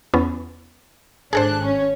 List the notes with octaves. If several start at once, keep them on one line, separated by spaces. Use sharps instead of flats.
E2 B3 C#4
G#1 D4 G#4 A4 C5 F#6
C#4 C#5